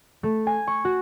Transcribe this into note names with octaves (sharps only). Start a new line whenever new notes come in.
A3
G#5
C#6
F#4